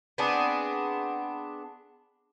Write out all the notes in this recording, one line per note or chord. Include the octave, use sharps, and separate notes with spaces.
B3 C4 D4 G#4